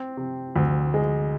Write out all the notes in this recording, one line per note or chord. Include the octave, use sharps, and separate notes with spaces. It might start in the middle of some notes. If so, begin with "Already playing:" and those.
Already playing: C4
C3
D2
G#3